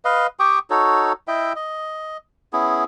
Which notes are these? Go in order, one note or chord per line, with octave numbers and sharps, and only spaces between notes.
B4 D#5 F5
G4 G5 C#6 D#6
D#4 F#4 A4 C#5
E4 D#5 E5 G5
D#5
B3 C#4 E4 G#4